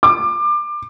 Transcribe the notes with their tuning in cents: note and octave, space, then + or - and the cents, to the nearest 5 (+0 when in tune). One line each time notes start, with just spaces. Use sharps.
D6 +25